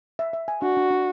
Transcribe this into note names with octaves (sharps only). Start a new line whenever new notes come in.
E5
E5
G#5
D4 F#4
D4
D4